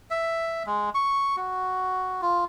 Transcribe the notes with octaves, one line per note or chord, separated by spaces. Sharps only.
E5
G#3
C#6
F#4
F4